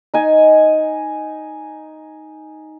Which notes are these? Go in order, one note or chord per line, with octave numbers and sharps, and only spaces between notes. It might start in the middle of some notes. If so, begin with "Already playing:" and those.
D#4 G#5